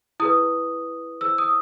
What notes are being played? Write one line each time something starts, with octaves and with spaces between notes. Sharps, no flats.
E4 G#4 B4 D#6
E4 G#4 C5 E6
D#6